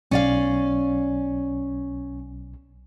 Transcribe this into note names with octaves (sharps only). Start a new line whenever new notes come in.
B1 C#4 D5 F5